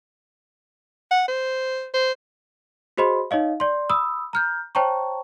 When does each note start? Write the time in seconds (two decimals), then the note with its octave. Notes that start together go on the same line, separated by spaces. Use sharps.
1.11 F#5
1.28 C5
1.94 C5
2.97 F#4 G#4 C5 D#5 B5 C6
3.31 D#4 C#5 D#5 F5
3.60 D5 C6
3.90 B5 D#6 E6
4.33 A#5 F6 G6
4.75 C5 C#5 G5 A5 A#5 C#6